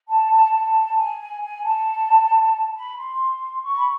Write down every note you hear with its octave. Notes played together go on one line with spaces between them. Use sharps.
A5
A5
A5
G#5
G#5
G#5
A5
B5
C6
C#6
B5